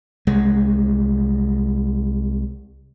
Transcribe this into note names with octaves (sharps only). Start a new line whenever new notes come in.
C2 G#3